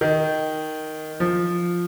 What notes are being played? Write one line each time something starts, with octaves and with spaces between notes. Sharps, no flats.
D#3
F3